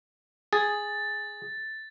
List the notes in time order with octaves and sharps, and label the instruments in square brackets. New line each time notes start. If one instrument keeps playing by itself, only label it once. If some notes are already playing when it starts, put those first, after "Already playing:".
[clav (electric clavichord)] G#4 [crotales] A6